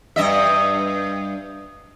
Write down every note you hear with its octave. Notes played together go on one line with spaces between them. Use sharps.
G2 D#5 E5